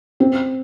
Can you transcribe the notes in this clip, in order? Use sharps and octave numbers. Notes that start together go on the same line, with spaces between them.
C4